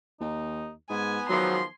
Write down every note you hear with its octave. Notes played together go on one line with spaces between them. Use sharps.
D#2 D#4
G#2 B3 G#5
G#2 D#3 F3 F#3 C6